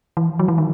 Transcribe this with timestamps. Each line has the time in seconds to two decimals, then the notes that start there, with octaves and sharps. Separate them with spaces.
0.17 E3
0.39 F#3
0.48 E3
0.58 D#3